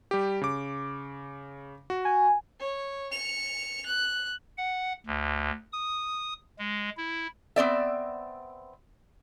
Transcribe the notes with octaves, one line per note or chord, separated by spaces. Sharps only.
G3 G4
C#3 D6
F#4
G#5
C#5
C#7 F7
F#6
F#5
D2
D#6
G#3
E4
B3 C4 D5 E5